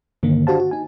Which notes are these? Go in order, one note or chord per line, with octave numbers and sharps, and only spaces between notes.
G2 D3 D#3 A#3
D4 F#4 G4 C5 F5 A5
F#4
D#4 G#5